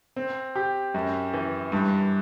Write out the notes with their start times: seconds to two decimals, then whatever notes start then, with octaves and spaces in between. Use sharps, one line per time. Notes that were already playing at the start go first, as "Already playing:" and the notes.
0.16 C4
0.56 G4
0.94 F#2
1.34 E3
1.72 G2